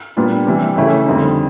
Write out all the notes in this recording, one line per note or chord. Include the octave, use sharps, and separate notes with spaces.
A#2 G3 B3 D4
C3 E3 G3
C#3 E3 A3 C#4 E4
F2 D3 G3 C4 D#4